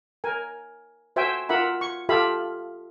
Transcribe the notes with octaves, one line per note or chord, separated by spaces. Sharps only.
A#4 G#5
F#4 C5 E5 G5 G#5
F4 A#4 E5 F#5 B5
C#6
F4 G4 A4 E5 F5 B5